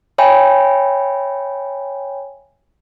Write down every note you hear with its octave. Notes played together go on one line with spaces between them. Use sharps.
C#5 E5 G5 G#5 B5